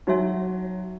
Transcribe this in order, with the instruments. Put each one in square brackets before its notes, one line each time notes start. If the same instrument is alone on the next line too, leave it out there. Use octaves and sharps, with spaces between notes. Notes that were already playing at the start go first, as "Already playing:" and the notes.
[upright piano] F#3 [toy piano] D#4 F#4 C#5 E5 G#5